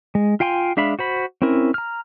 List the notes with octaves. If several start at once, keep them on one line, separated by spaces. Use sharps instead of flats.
G#3
F4 F5 G5 G#5 C6
G#3 D4 E5 F5 B5
F#4 C5 B5
C4 C#4 E4 A#4
A#5 F6